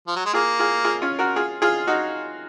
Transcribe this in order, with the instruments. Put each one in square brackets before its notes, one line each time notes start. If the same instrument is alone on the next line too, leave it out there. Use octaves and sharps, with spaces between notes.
[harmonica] F3
F#3
G#3
[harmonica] A#3 [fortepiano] F4 G#4
[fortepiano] F4 G#4
F4 G#4
C#4 F4
F#4 A#4
F4 G#4
F4 G#4
D#4 F#4